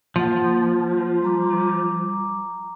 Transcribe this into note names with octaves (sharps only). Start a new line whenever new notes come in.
F3 A#3 F#5
G3 A#5 D6